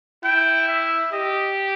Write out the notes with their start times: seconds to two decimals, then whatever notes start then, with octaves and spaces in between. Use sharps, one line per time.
0.24 E4 G5
0.68 E5
1.12 G4 D#5